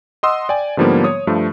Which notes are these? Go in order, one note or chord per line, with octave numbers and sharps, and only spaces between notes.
D#5 F#5 C6 D#6 E6
D5 G5 G#5
G#2 D3 F3 G3 A#3 B3
C#5 D#6
G2 F3 A3